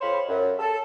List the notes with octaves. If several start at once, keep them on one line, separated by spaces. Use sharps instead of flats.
F2 C5 C#5 F5 B5
F#2
A4